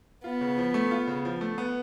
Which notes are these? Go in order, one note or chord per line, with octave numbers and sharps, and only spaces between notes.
B3 F4
C#3
F3
A3
F4
C#3
F3
A3
B3